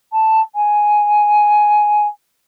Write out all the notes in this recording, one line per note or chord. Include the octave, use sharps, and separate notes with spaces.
A5
G#5